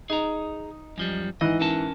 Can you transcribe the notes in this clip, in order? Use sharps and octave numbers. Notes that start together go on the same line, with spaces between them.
D#4 G#4 A#5
F#2 F3 G3
G#2 E3 D#5
C#4 A#4 A5